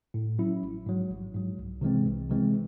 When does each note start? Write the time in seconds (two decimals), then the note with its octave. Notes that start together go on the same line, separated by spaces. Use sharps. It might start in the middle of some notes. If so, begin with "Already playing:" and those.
0.14 A2
0.39 F#3 C#4 E4
0.62 A1
0.86 G#2 F#3
1.10 A1
1.34 G#2 F#3
1.58 C2
1.81 C3 E3 G#3 C4
2.06 C2
2.29 C3 E3 G#3 C4